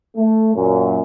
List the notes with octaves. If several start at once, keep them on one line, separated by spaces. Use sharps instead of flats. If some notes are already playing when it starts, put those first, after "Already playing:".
A3
F#2 A#2